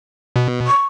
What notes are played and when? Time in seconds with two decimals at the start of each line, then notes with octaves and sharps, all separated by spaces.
0.36 B2
0.67 C#6